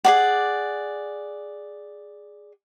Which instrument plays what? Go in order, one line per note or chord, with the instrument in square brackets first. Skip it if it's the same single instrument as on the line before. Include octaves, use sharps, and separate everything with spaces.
[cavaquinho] G#4 D5 F#5